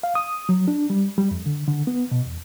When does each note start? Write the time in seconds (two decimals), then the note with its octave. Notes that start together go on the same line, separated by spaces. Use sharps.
0.03 F5
0.15 D#6
0.49 F#3
0.68 D4
0.90 G3
1.18 G3
1.31 F2
1.46 D3
1.68 D3
1.87 B3
2.12 B2
2.26 E2